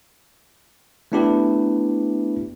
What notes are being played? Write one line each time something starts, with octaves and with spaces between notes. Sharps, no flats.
A3 B3 D4 E4 G4 B4